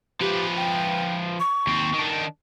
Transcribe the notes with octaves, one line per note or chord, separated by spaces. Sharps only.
F3 G4 B4
G5
C#6
D#2 C4
D#3 D4